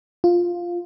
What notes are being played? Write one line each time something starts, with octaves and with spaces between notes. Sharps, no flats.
F4